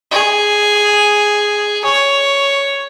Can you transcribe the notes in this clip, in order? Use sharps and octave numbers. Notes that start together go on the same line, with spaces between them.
G#4
C#5